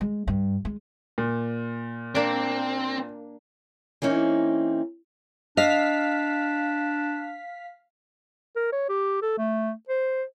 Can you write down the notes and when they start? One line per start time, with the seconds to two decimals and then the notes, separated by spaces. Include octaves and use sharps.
0.01 G#3
0.28 G2
0.65 G#3
1.18 A#2
2.15 A#3 C4 D4
4.02 E3 A#3 C4 C#4 D#4
5.57 D4 D#5 F5 B6
8.56 A#4
8.72 C#5
8.89 G4
9.22 A4
9.38 A3
9.89 C5